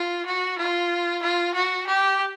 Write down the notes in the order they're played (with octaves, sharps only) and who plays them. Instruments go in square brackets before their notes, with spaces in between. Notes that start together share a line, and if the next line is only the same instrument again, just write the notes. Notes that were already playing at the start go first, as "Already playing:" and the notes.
Already playing: [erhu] F4
F#4
F4
F4
F#4
G4